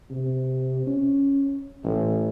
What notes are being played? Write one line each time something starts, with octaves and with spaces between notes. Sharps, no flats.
C3
C#4
A1